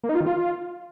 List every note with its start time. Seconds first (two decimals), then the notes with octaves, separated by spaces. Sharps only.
0.04 A#3
0.09 D#4
0.15 F4
0.21 D#3
0.26 F4